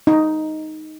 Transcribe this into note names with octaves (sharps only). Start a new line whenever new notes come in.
D#4